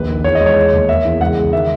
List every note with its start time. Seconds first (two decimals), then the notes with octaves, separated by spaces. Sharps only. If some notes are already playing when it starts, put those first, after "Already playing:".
Already playing: A#1 D#2 B4
0.08 D#3
0.24 E2 C#5
0.35 D#5
0.40 G#3
0.46 C#5
0.56 G#3
0.73 D#2
0.88 A#3 E5
1.05 E2
1.20 C#2 F#5
1.37 C#2
1.53 D#3 E5